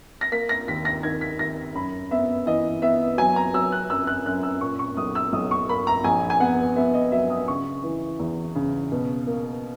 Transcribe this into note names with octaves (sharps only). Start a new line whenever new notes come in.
A#6
A#3 B6
A#6
D#2 B6
A#6
D#3 G#6
B6
D#2 A#6
F#2 B5
B3 E5
E3 D#5
B3 E5
F#3 G#5
A#5
F#3 E6
F#6
F#2 E6
F#6
F#2 F#6
E6
A#2 C#6
C#6
B1 D#6
E6
B1 D#6
C#6
A#3 B5
A#5
A#1 G#5
G#5
B3 F#5
B3 E5
D#5
F#3 E5
D#6
C#3 C#6
E3
E2
C#3
B2
A#3